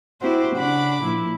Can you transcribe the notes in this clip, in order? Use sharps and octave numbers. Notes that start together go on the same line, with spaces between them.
C4 E4 F#4 G4 C5
C#3 D4 F#5 B5 D6
A#2 F3 E4